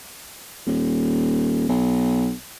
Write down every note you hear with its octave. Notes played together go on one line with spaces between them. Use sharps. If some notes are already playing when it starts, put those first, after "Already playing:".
D#1
B1